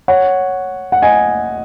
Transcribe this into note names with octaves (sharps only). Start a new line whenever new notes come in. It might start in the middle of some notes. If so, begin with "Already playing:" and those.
C#5 F#5
F#5
D#5 G#5